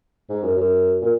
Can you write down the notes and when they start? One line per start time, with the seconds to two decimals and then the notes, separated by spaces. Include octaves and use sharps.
0.29 G#2
0.43 F#2
0.57 F#2
1.02 A#2